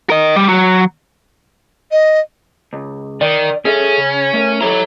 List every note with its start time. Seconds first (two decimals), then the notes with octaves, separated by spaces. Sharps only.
0.10 A#4 D#5
0.36 G3
0.49 F#3
1.92 D#5
2.73 C#2
3.21 D#3 D5
3.65 C#4 G#4 A4 E5
3.98 C#3
4.34 A3 A#4
4.61 E4 G4 A4 C#5 A#5